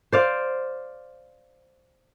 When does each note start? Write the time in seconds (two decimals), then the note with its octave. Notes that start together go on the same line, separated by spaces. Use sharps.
0.12 C5 D5 F5